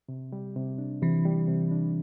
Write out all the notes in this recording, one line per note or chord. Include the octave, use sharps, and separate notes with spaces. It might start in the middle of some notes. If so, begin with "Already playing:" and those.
C3
G3
C3
D4
C3 E3
G3
C3
D4